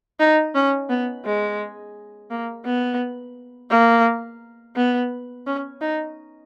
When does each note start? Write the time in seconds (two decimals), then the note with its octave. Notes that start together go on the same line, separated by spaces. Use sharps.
0.20 D#4
0.55 C#4
0.89 B3
1.25 G#3
2.31 A#3
2.65 B3
3.71 A#3
4.76 B3
5.47 C#4
5.81 D#4